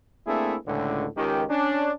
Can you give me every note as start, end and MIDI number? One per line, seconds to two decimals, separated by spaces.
0.27 0.56 57
0.27 0.56 58
0.27 0.56 60
0.27 0.56 62
0.27 0.56 64
0.27 0.56 68
0.67 1.06 37
0.67 1.06 45
0.67 1.06 50
1.17 1.44 37
1.17 1.44 51
1.17 1.44 67
1.49 1.92 61
1.49 1.92 62